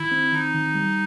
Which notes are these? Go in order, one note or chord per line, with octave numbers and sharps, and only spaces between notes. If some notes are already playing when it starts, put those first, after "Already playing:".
Already playing: D#3 E4
C4
D#3 D#4
D#3
G3